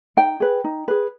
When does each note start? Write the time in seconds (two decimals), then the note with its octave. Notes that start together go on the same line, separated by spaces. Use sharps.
0.17 D#4 G5
0.40 G#4 B4
0.64 D#4
0.88 G#4 B4